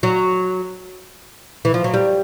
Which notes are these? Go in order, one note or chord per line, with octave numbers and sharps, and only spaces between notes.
F#3
E3
F3
F#3
G3